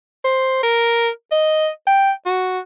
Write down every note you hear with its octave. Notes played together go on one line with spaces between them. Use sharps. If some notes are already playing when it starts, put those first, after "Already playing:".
C5
A#4
D#5
G5
F#4